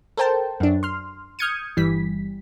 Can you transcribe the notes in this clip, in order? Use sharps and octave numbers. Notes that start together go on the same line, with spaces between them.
A4 A#4 C5 G5 A5
F#2 D4
C6 F6
D#6 F6 G6 G#6 C#7 D#7
G1 E3 G3 B6